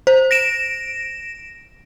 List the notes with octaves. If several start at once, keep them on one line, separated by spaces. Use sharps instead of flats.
C5
A#6 D7 E7